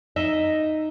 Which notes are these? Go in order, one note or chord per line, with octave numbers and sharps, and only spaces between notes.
D#4 D#5 E5